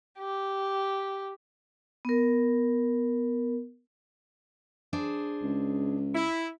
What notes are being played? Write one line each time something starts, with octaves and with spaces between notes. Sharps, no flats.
G4
B3 A#4
D4 G#4 C5
C#2
E4